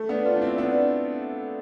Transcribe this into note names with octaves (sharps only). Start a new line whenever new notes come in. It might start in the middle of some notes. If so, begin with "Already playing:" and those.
Already playing: A3
B3 D4
D4 F4
D4
C4 E4
B3 D4